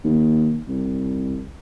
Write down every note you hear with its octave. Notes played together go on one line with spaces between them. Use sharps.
D#2
C2